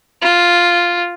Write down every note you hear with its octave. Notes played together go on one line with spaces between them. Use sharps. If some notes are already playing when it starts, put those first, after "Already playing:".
F4